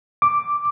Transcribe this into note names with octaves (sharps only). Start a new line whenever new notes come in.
D6